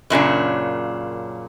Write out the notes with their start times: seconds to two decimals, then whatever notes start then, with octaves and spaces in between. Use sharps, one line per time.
0.10 F#2 A#2 C#3 D4